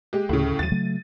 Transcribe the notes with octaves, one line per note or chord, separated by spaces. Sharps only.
G#3 G4
D2 A2 C#3
D#2 F#3 A6 D#7
C#3 F#3 A3